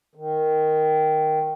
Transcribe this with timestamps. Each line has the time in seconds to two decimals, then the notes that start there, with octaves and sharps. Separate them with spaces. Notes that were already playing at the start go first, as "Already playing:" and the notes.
0.15 D#3